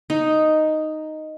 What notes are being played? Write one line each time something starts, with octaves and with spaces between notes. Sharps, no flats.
D#4